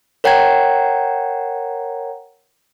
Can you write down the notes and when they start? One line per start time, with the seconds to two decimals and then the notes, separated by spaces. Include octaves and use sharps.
0.24 A#4 C#5 F#5 G5 A#5 G#6